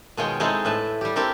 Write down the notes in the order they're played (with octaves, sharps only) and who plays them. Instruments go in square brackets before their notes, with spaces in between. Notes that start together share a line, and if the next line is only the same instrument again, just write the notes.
[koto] B2 D#3 G#3 F4 C#5 G5
G#3 C4 D#4 E4 G#4 A4
A2 B4 E5 A5
G3 G4
C4 E4 G4 A4 A#4